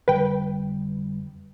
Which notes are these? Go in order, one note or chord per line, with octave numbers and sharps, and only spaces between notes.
F1 D3 G3 B4 G5